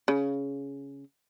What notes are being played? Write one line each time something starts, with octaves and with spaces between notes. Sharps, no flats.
C#3